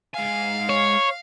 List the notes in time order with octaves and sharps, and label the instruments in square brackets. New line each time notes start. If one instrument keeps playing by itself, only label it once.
[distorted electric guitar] G#2 G#5 [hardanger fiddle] F5
[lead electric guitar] C#5